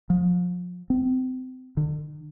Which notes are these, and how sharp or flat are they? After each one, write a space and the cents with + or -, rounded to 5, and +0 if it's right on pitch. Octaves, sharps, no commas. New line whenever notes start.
F3 +35
C4 -30
D3 +40